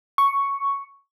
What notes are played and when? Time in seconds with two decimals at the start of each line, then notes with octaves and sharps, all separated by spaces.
0.18 C#6